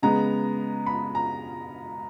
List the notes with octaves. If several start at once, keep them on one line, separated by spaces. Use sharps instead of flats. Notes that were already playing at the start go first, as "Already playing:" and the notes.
C#3 G#3 B3 A#5
B5
A#5